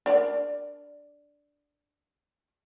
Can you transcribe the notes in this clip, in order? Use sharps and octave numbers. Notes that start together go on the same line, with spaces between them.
D4 A#4 D5